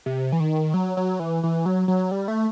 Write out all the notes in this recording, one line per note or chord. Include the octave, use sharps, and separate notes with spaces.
C3
E3
D#3
F#3
F#3
E3
E3
F#3
F#3
G3
A3